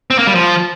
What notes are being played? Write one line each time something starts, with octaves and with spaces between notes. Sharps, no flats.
C4
A#3
G3
F3